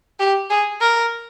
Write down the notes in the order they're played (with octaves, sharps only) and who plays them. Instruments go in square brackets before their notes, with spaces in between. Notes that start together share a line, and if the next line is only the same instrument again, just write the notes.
[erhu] G4
G#4
A#4